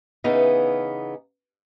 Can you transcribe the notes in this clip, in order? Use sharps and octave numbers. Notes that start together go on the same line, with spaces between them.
C#3 E3 B3 D#4